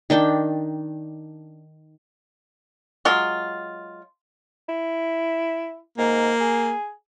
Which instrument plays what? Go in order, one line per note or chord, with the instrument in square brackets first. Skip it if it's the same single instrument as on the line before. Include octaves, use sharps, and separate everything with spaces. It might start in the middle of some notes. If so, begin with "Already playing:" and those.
[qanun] D#3 D4 G5 A5
[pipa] F#3 G#3 F4
[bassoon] E4
[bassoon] G#2 [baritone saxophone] A#3
[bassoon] G#4